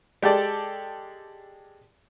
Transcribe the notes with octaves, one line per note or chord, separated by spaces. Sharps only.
G#3 G4 A4 D5